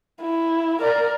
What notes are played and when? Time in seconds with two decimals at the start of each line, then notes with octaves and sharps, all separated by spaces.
0.22 E4
0.81 A#4 D5